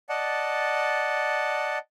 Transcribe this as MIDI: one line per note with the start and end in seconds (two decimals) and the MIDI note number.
0.09 1.78 74
0.09 1.78 75
0.09 1.78 78
0.09 1.78 81